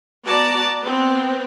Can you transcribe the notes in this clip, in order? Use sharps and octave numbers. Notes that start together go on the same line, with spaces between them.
B3 F#4 D5 A5 A#5
B3 C4